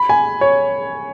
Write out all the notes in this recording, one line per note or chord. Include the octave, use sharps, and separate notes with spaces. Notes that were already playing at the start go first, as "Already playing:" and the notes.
Already playing: B5
G#5
C#5